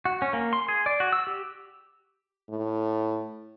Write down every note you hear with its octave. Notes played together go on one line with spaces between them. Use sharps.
F#4
C#4
A#3
C6
G#4
D5
F#4
E6
G4
A2